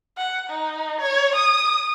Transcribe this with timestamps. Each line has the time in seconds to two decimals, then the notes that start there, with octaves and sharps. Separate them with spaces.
0.17 F#5
0.50 D#4
1.01 C#5
1.36 D#6